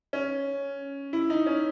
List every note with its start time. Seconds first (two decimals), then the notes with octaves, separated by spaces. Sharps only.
0.13 C#4
1.13 E4
1.30 D#4
1.46 C#4